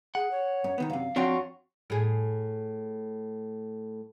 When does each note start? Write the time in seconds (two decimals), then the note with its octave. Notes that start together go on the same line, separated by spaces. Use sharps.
0.15 G#4 F#5
0.31 C#5
0.64 F#2
0.78 C2 D#3 B3
0.90 F#2 C3 F5
1.16 F2 F#3 C4 D4 F4 F#4 G5 C#6
1.90 A2 G#4